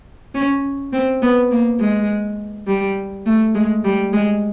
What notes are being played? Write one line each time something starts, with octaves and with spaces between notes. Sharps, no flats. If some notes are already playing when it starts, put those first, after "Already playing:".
C#4
C4
B3
A#3
G#3
G3
A3
G#3
G3
G#3